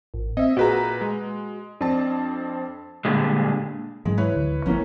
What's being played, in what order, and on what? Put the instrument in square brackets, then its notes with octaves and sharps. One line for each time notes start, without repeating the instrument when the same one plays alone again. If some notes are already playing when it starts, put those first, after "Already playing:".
[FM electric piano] A1
[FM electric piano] C4 [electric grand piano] D#5 E5
[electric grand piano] A#2 B4 A#5 [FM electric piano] F#4 G#4
[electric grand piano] G#3
[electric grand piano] F2 C4 A5 [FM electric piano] D4
[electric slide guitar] A#2 D3 G3 G#3
[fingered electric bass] G#2 E3 F#3 [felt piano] G#3
[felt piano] E4 B4 C#5
[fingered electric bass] D2 D3
[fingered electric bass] A1 F3 B3 [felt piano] A2 A#3 C#4